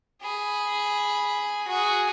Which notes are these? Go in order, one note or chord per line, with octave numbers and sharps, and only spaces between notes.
G#4 B5
F#4 G#4